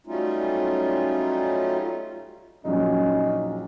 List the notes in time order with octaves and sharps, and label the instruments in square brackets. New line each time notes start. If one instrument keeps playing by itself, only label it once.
[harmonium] F#3 G3 A3 C#4 D#4 F4
[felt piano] A#1 F#2 [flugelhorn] C#4 [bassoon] D#4